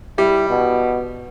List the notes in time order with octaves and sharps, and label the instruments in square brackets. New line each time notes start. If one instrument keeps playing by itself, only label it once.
[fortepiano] G3 [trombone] E4
[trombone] B2